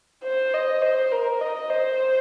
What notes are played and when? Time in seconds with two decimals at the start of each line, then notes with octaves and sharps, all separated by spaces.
0.23 C5
0.54 D#5
0.82 C5
1.12 A#4
1.41 D#5
1.70 C5